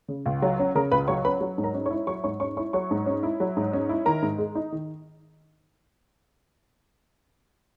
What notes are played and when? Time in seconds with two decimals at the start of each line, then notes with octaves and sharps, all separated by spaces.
0.08 C#3
0.26 C#2
0.42 F#3
0.59 C#4
0.75 C#3 A#4 A#5
0.91 C#2 B4 B5
1.08 F#3 C#5 C#6
1.25 C#4 B4 B5
1.41 F#3
1.58 G#2
1.64 A#4 A#5
1.74 C#4
1.86 C#5 C#6
1.90 E4
2.07 F#3 C#5 C#6
2.24 G#2 C#5 C#6
2.40 C#4 C#5 C#6
2.57 E4 C#5 C#6
2.73 F#3 C#5 C#6
2.91 G#2
3.06 C#4
3.23 E4
3.40 F#3
3.57 G#2
3.73 C#4
3.89 E4
4.06 D#3 A#4 A#5
4.22 G#2
4.38 G#3
4.55 D#4
4.72 D#3